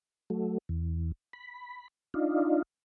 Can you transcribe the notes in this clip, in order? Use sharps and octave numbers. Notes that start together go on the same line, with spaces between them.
F#3 A3
E2
B5
D4 D#4 F4